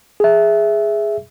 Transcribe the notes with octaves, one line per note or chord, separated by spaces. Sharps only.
G#4 E5